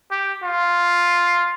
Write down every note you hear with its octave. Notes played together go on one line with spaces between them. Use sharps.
G4
F4